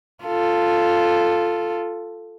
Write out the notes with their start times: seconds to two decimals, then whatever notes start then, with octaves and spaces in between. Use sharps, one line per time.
0.24 F4 A4